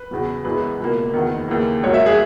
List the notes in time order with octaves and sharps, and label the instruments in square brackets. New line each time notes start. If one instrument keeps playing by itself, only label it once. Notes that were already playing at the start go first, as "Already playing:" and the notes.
Already playing: [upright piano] B4
E2 C#3 F#3
F#2 E3 G#3 B3 B4
C#2 B2 A#3
F#1 E2 D#3
D#2 C#3 E3 A#3
G#1 G#2 F#3 A#3 C#5
E5
G#4